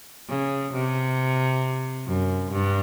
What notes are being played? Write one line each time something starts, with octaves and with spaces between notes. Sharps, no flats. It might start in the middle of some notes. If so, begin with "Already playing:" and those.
C#3
C3
F#2
G2